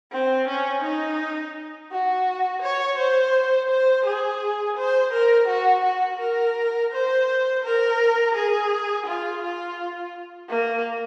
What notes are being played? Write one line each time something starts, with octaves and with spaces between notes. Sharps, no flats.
C4
C#4
D#4
F#4
C#5
C5
C5
G#4
C5
A#4
F#4
F#4
A#4
C5
A#4
G#4
F4
F4
A#3